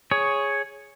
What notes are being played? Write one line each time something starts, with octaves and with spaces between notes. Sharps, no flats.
G#4 C#5